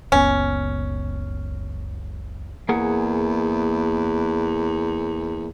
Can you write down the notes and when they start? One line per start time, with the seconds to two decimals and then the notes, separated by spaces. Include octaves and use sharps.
0.12 F#1 C#2 B3 C#4
2.69 E2 A#3 G#4 F#5